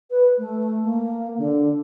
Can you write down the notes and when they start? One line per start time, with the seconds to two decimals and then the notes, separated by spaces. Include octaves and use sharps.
0.11 B4
0.38 A3
0.83 A#3
1.37 D3